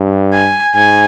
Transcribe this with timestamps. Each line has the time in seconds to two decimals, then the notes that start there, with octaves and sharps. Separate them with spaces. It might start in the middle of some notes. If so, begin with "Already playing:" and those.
Already playing: G2
0.33 G#5
0.75 G#2 G#5